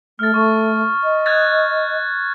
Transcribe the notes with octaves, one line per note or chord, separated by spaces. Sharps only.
A3 F6 A6
A3 C#6
D#5
F#6 G#6 A6